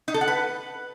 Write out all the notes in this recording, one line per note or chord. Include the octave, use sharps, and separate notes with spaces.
D#4
A4
F#5
B4